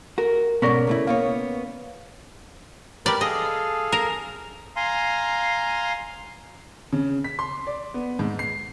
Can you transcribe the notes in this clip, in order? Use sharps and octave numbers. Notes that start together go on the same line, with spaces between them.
F#4 A#4
G#2 B2 B3 C#4 A#4 D5
C#3 A3 E4
A#3 B3 C#5 F5
G3 A#4 B4 D5
G#4 A4 D#5 F5
A#4
F5 G#5 A#5 C6
C#3
B6
C6
D5
B3
G#2
C7